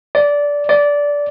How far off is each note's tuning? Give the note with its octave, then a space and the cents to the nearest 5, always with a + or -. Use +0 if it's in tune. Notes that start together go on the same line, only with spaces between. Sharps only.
D5 -15
D5 -15